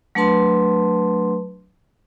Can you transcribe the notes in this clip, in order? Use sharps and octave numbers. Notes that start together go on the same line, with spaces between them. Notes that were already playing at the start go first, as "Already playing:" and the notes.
F#3 A3 D4 B4 A5 C6